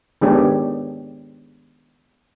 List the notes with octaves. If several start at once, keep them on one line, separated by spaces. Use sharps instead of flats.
D#3 G#3 B3 D4 G4 C#5